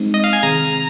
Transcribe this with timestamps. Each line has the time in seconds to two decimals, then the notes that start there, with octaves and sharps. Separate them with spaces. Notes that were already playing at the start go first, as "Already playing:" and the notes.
Already playing: G#3 C4 D#4
0.14 D#5
0.24 F5
0.33 G#5
0.43 C3 D#3 C4 G#4 A#5